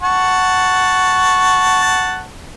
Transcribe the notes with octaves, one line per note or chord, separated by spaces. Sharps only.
F#5 A5 C#6